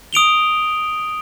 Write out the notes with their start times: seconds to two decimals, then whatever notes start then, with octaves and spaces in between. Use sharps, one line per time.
0.13 D#6 D7 F7 G7